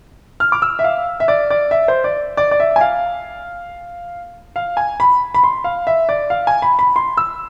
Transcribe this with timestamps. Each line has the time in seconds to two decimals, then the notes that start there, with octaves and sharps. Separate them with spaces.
0.40 F6
0.52 D6
0.62 E6
0.79 E5
0.84 F5
1.20 E5
1.28 D5
1.50 D5
1.71 E5
1.88 C5
2.04 D5
2.37 D5
2.51 D5
2.60 E5
2.76 G#5
2.81 F5
4.56 F5
4.77 G#5
5.00 B5
5.34 B5
5.43 C6
5.64 F5
5.87 E5
6.09 D5
6.30 F5
6.47 G#5
6.62 B5
6.79 B5
6.96 C6
7.17 E6